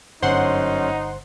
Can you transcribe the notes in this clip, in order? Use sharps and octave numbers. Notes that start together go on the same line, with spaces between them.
G1 F#2 C#4 D#4 C5 F#5 C6